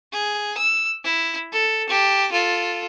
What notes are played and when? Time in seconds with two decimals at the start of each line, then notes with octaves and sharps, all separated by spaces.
0.12 G#4
0.58 E6
1.04 E4
1.53 A4
1.89 G4 A5
2.32 F4 A4